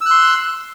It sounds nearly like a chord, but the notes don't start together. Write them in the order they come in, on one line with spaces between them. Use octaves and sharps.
E6 F#6 C6